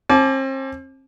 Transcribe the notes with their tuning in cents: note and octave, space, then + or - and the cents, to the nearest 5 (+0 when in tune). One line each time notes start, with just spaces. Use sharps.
C4 +40 A5 -40 D6 +0